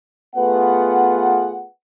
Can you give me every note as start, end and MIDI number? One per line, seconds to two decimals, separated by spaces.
0.36 1.66 57
0.36 1.66 59
0.36 1.66 65
0.36 1.66 68
0.36 1.66 71
0.36 1.66 78